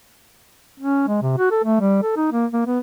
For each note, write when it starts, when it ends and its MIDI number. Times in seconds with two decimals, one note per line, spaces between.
0.80 1.06 61
1.08 1.21 56
1.22 1.33 48
1.38 1.51 66
1.51 1.60 69
1.64 1.80 57
1.80 1.99 55
2.03 2.16 69
2.16 2.32 63
2.32 2.46 58
2.53 2.63 58
2.67 2.79 59